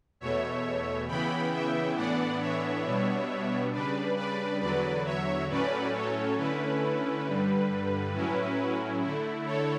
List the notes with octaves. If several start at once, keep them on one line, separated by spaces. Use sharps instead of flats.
E2 B2 A3 C#5 E5
C#3 E3 B3 E4 G5 B5
E5 G5
A2 E3 B3 D4 D5 F#5
C#5 E5
B2 G3 B3 D4
C#3 G3 D4 B4 D5
B4 D5
E2 D3 F#3 B4 D5
C#5 E5
A2 F#3 A3 C#4 B4 D5
A4 C#5
D3 A3 C#4 E4 B4
G2 D3 G3
A2 F#3 C#4 E4
D3 A3 E4
A4 C#5